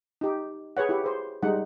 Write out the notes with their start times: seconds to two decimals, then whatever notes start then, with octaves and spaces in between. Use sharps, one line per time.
0.21 D#4 G4
0.77 G#4 B4 C#5 F#5
0.89 E4 G4
1.04 G#4 C5
1.43 G3 G#3 D#4 F#5